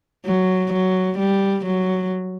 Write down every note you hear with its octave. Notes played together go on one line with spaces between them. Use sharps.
F#3
F#3
G3
F#3